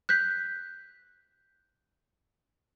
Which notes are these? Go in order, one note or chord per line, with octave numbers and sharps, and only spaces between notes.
F#6 G6 B6